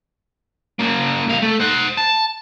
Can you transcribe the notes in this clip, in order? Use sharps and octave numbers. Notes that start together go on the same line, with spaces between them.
C#3 A#3
C2 F5
A3
C5 F#5
A5